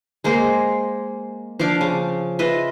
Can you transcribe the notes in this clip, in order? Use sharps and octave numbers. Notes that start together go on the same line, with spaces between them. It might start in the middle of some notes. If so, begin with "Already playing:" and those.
G#3 A#3 G#4 C5
F3 D4 F5 D6
C#3
F4 B4 D#5 E5